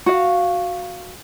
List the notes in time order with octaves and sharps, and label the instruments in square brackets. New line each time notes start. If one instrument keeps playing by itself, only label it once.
[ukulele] F#4 F5